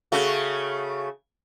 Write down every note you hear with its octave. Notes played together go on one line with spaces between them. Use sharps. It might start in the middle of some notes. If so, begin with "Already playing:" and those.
C#3 A3 F#4